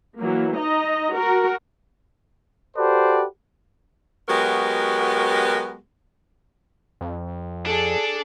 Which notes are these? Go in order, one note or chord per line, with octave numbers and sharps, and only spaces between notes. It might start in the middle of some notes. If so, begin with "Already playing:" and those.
E3 F#3 A#3
D#4 D#5 A#5
F#4 A#4
F#4 G4 A4 B4 C5 D5
F#3 G#3 B3 F#4 G4 A#4
F2
D4 G#4 A4